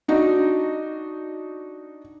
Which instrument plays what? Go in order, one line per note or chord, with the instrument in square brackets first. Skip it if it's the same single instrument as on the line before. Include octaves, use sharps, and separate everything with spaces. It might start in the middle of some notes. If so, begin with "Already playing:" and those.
[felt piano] D4 D#4 F#4